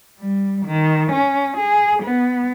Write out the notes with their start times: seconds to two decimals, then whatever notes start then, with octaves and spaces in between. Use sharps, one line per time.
0.20 G3
0.66 D#3
1.12 C#4
1.58 G#4
2.03 B3